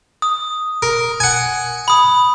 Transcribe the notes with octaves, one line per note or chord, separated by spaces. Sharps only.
D#6
A#4
F#5 G#5
B5 D#6